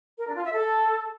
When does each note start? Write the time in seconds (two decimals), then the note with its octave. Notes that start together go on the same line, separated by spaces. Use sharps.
0.18 A#4
0.27 D4
0.35 F4
0.44 E5
0.52 A4